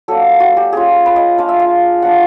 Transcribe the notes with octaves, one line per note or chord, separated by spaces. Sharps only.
F#3 A#3 D4 A4
F#4
G4
A#3 C#4 F4 G#4
B4
D#5
A#3 D4 F4 F5
E5
F5
F3 A#3 D4 F4 F#5